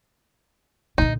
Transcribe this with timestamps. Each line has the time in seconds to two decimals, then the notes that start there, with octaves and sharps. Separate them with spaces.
0.98 A#2 D3 D#4